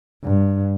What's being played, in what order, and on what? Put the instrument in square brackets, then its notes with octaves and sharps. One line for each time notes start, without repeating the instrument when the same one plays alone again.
[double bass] G2